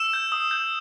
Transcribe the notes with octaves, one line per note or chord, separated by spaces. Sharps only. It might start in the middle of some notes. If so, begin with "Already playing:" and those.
Already playing: E6 E7
G6
D#6
G6